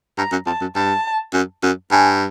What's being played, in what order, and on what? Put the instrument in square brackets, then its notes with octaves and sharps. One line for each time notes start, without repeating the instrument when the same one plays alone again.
[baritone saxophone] G2 [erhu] A#5
[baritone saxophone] F#2
[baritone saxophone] F2 [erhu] A5
[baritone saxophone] F#2
[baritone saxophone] G2 [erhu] A5
[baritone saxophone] F#2
F#2
[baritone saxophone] G2 [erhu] G#5